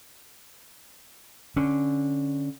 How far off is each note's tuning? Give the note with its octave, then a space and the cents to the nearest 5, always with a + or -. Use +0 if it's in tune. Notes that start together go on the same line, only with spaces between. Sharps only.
D3 +0 C#4 +0